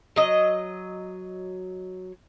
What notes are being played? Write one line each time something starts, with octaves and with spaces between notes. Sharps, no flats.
F#3 D#5